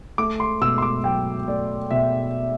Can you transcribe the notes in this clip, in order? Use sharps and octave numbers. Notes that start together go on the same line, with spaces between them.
A3 D6
C6
B2 E6
C6
D6
F#3 G5
A3 D5
B2 E5